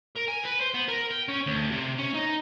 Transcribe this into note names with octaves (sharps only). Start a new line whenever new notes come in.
A#4
G#5
B4
C5
B3
A#4
G5
C#4
D2
C3
C#4
D#4